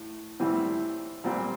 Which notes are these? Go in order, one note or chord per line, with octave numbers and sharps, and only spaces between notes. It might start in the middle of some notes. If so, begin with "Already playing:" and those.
Already playing: A2
A2 E3 G3 C4
A#2 G3 C4